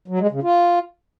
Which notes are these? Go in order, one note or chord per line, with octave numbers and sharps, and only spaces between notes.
F#3
G#3
C#3
F4